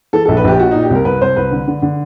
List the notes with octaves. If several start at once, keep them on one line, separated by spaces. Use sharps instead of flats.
E3 A4
A#1 A4
B4
A#1 G4
A#2 F#4
A#2 D#4
G4
C2 A#4
C2 B4
C2 C5
C2 B4
D3
D3
D3